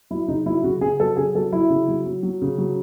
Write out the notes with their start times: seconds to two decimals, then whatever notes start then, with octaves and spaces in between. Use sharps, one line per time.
0.11 F#3 E4
0.28 C#3 D#4
0.46 F#3 E4
0.63 C#3 F#4
0.81 C#3 G#4
0.99 F#3 A4
1.17 C#3 G#4
1.35 F#3 A4
1.52 F#3 E4
1.70 C#3
1.88 F#3
2.06 F#3
2.23 F#3
2.42 C#3
2.58 F#3